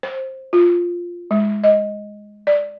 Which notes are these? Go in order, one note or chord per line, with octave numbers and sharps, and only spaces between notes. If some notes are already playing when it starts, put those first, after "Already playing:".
C5
F4
G#3
D#5
D5